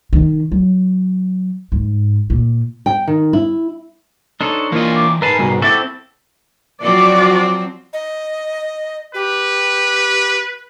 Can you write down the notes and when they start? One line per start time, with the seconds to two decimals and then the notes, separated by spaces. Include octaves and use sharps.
0.13 D#3
0.52 F#3
1.72 G#2
2.30 A#2
2.86 G5
3.08 D#3
3.33 E4
4.41 D4 D#4 A4 C5 C#5
4.72 E3 A#3 F4 D#5
4.95 D6
5.22 E2 G#2 A#4 B4 G#5 A5 B5 C7
5.39 C2 B2
5.62 C4 E4 F#4 A4 E5 D6 A6
6.81 F3 F#3 C4 F#4 D5
7.93 D#5
9.14 G4 B4